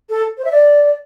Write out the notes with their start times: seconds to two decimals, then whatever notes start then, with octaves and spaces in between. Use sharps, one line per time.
0.09 A4
0.38 C5
0.45 E5
0.52 D5